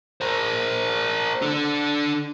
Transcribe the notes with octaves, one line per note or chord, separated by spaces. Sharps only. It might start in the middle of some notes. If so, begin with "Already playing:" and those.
A#4 C5
D4 A4